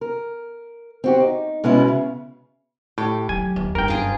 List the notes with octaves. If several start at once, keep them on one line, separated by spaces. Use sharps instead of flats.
A#4
C4 F#4 G4
D#4
B2 G#3 B3 C#4 E4
C#3
A2 G4
F#3 G#5
D#2
F#1 G2 A#4 G5
F4 G#4